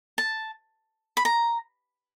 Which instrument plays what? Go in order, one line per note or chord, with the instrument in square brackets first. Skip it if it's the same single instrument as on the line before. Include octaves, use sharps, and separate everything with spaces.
[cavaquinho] A5
B5
A#5